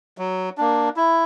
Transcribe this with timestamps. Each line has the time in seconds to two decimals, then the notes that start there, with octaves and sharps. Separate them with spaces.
0.18 F#3
0.58 A#3 D4
0.97 E4